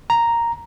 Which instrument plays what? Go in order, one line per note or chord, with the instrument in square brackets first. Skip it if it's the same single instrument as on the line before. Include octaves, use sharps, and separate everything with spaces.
[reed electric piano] A#5